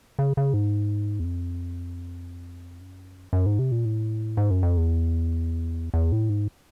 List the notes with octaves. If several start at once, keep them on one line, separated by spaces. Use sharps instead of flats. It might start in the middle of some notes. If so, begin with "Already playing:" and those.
C#3
C#3
G#2
E2
F2
F#2
F#2
G#2
C3
A#2
A2
G#2
F#2
F2
E2
E2
A2
G#2